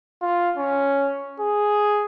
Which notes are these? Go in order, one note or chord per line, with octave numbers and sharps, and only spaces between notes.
F4
C#4
G#4